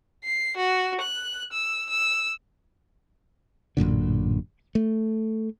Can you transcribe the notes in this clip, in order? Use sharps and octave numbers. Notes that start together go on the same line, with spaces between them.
C7
F#4
F#6
E6
E6
A1 F#2 A#2 D3
A3